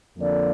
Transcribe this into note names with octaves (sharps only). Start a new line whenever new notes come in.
F2 D3 F3 A#3 D5